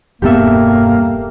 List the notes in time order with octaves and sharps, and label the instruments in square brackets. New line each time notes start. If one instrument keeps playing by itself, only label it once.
[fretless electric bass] E1 G2 B3 [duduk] A#3 [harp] G4 A4 E5